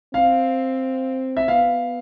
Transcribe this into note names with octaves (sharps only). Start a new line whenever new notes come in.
C4 F5
E5
B3 F5